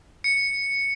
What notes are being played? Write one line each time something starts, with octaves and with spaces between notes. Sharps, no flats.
C#7